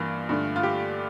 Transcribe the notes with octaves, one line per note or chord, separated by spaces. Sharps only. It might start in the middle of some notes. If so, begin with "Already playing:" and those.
Already playing: G2 E3 A#3 F4
G2 D3 A3
F4
G4